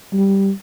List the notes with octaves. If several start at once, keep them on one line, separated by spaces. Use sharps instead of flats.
G3